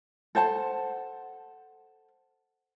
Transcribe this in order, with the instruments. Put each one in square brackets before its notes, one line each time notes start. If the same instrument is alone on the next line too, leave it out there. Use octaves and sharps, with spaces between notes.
[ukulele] A4 C5 F#5 A5